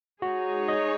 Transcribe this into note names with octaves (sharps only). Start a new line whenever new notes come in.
G#3 D#4 F#4 G#4 C#5
D#5